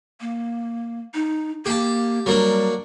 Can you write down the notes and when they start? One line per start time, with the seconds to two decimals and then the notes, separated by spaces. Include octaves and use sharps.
0.21 A#3
1.14 D#4
1.66 A#3 G4 A5
2.26 F#3 G3 A#3 D4